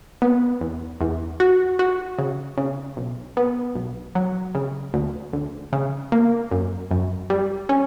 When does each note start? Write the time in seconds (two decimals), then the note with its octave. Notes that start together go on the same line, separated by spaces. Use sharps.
0.22 B3
0.61 E2
1.01 E2
1.40 F#4
1.79 F#4
2.18 C#3
2.58 C#3
2.97 B1
3.37 B3
3.75 B1
4.15 F#3
4.55 C#3
4.94 D2
5.33 D2
5.73 C#3
6.12 A#3
6.51 F#2
6.91 F#2
7.30 G3
7.69 C#4